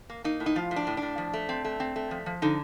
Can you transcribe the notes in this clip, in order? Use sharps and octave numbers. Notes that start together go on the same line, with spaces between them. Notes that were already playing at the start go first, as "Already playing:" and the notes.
A#3
A#3 D#4
A2
D#4
F3 F4
A2
D4
A2
A2 D4
F3
A3
C4
A3
C4
A3
F3
F3
D3 D#4